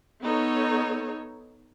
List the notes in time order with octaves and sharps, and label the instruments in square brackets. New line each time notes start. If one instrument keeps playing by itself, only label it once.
[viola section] B3 D#4 A4 C#5